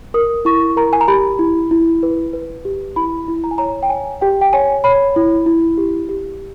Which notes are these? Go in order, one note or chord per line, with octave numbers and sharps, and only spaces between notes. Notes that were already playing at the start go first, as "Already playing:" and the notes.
A#4 D#6
E4 C#6
A#4 A#5
G#5
A#5
G4 B5
E4
E4
B4
B4
G4
E4 B5
E4
A#5
G#5
C#5 A#5
G5
C#5 G#5
G4 G5
G5
C#5 G#5
C#5 B5
E4
E4
G4
G4